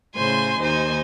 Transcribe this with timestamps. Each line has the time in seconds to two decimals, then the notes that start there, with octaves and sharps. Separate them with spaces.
0.15 A2 C#3 C5 G#5 C6
0.60 D#2 D#4 C5 G#5